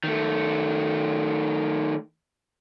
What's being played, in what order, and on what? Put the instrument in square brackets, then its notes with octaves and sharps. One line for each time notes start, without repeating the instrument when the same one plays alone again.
[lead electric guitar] D#3 A3